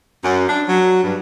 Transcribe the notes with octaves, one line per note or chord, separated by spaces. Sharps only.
F#2
D4
F#3
G2